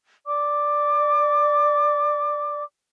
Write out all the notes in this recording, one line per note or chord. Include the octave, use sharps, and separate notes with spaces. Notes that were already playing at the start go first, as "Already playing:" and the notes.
D5 D6